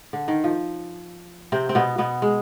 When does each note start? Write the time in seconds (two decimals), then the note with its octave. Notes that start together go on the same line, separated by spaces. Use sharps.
0.13 D3
0.28 D#3
0.44 F3
1.52 C3 C4
1.69 C4
1.75 B2 B3
1.98 B2 B3
2.22 G#3